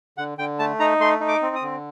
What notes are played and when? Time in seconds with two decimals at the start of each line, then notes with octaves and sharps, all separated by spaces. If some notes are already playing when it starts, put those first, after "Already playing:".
0.18 D3 F#5
0.38 D3 G5
0.59 A3 A5
0.80 D#4 A#5
1.00 A3 C6
1.21 D#4
1.28 D6
1.42 C4
1.55 D#6
1.62 D3